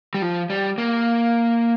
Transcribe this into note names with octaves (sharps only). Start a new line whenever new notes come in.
G3
F3
G3
A#3